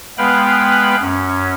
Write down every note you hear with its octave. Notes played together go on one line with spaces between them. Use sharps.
G#3 B3 B4 F5 G5 B5
F#2 C#4